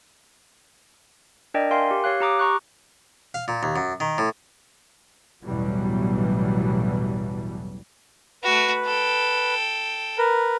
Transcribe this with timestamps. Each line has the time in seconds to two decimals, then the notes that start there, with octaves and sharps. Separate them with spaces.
1.54 D4 A#4 D5 D#5 G5
1.71 A#4 E5 F5 G5 G#5 C6
1.91 G4
2.04 G4 C#5 F5 F#6
2.20 G4 A#5 D6 D#6
2.39 A#5 C#6 F#6
3.34 F5
3.48 A#2
3.63 D#2
3.76 F#2
4.00 D#3
4.18 A2
5.44 A1 E2 B2 E3 F#3 G3
8.43 A3 F#4 B4
8.86 A4 G5
10.18 A#4 B4